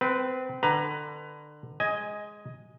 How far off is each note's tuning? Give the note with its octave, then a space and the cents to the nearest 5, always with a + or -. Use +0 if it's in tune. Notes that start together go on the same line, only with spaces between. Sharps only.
C4 -25 B4 +0
D3 +30 B4 +20 A#5 +15
G#3 +0 D#5 +15 G#5 +0